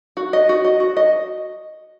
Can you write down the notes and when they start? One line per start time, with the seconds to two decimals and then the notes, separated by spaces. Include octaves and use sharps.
0.17 F#4
0.33 D#5
0.49 F#4
0.64 D#5
0.80 F#4
0.97 D#5